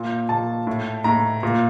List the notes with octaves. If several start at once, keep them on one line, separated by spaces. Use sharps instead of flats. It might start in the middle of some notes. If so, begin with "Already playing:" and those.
Already playing: A#2
A#2 A5
A2
A2 A#5
A#2